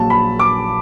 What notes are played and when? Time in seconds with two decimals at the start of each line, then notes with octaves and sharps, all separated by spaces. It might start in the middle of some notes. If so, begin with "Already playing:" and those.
Already playing: A#1 A#2 F#3 A5
0.10 B5
0.39 D6